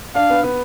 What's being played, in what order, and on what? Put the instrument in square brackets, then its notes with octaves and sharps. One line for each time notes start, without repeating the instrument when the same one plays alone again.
[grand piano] D4 [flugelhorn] F5
[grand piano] B3
B3